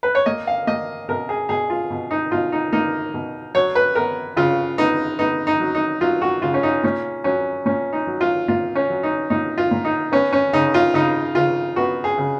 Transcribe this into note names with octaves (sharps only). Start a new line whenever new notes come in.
B4
C#5
A#3 D#5
F5
A#3 D#5
B2 A#4
G#4
B2 G#4
F4
B2
D#4
B2 F4
D#4
A#3 D#4
B2
F#3 C#5
B4
B3 A#4
C#3 F4
B3 D#4
B3 D#4
D#4
F#3
D#4
F#3 F4
F#4
C#3 F4
C#4
D#4
A#2 C#4
F#3 C#4
A#2 C#4
D#4
F#3
F4
A#2 F4
C#4
F#3
D#4
A#2 D#4
F4
A#2
D#4
B3 C#4
C#4
C#3 D#4
F4
C#3 D#4
C#3 F4
B3 F#4
G#4
C#3